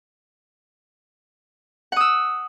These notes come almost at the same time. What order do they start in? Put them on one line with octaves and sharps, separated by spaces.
F#5 D#6 E6